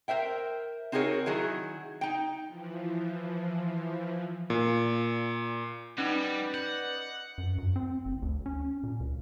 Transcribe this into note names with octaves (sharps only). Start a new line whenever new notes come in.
A#4 C5 E5 G5
C4 D#4 F#4 G#4 A#4 C#5
D#3 F#3 E4 G#4
D#4 G5
E3 F3
A#2
G3 C#4 D#4 B4 D5 D#5
F#5 G6
F#2
F#2
C4
F#1
D2
C#4
A#2
C#2